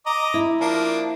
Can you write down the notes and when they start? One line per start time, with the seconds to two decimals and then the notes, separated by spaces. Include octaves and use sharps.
0.06 D#5 A#5 D6
0.34 E4
0.61 F3 A#3 D4